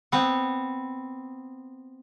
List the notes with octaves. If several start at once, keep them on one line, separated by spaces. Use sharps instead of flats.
B3 C4